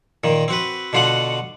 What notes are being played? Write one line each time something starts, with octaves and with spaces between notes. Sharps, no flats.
A#2 D#3
C4 F#4 B4
B2 D3 F4 F#4 F#5